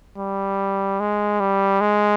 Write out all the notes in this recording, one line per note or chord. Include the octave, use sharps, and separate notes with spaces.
G3
G#3
G3
G#3